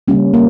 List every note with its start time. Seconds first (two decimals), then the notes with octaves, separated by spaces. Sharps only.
0.08 C#3 G3 A#3 C#4
0.34 A#3